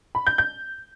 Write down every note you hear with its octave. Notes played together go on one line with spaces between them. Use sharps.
B5
G6
G6